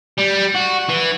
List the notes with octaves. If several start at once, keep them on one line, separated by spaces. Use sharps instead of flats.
G3
F#4
E3